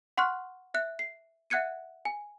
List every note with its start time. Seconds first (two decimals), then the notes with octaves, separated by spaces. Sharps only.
0.17 F#5 C6 C#6 F6 F#6
0.74 E5 F#6
0.99 C7
1.50 E5 F#5 F#6 G#6 C#7 D#7
2.05 G#5